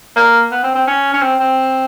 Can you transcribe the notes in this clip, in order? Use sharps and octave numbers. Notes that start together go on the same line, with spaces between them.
A#3
B3
C4
C4
C#4
C#4
C4
C4